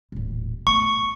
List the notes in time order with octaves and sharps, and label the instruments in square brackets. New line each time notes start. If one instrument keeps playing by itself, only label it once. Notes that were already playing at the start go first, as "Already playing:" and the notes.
[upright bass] D#1 A1
[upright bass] A3 B3 [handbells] C#6